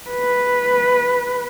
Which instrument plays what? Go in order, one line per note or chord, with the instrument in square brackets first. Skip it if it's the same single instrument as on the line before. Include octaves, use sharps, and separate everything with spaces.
[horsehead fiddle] B4